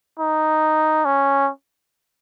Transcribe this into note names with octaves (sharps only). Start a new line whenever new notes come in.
D#4
C#4